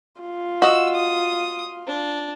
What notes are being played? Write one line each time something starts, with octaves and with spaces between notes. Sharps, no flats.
F4
F#4 D#5 E6
D#6
D4